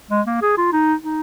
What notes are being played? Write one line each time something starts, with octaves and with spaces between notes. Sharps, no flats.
G#3
A#3
G#4
F4
D#4
D#4